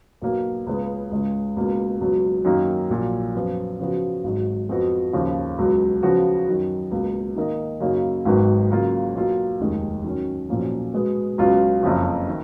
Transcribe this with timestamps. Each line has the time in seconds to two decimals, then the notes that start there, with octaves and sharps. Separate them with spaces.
0.22 B1 B2 F#3 A#3
0.67 C#2 C#3 G#3 B3
1.11 C#2 C#3 G#3
1.57 C#2 B2 A#3
2.01 C#2 B2 F#3
2.45 F#2 D#3 A#3
2.90 A#1 A#2 F#3
3.35 F#2 F3 B3 F4
3.79 C#3 F3 B3 F#4
4.24 G#1 G#2 F#3
4.69 F2 F3 B3 F#4
5.13 D#2 C#3 F3
5.58 C#2 B2 F#3
6.03 C#3 F3 B3 F#4
6.48 F#2 D#3 F#3
6.91 C#2 B2 A#3
7.37 D#3 A#3 D#4 A#4 D#5
7.80 F#2 C#3 F#3 A#3 D#4
8.25 G#1 G#2 D#3 F#3 B3
8.70 C#3 F#3 A#3 F4
9.15 B1 B2 A#3 F4
9.60 F1 D#2 D#3 G#3
10.04 D#3 F#3 C#4
10.49 B1 A#2 F3 A#3 C#4
10.94 B2 G#3 B3
11.38 C#2 B2 F#3 C#4 F4
11.83 F#1 F2 C#3 F3
12.28 D#3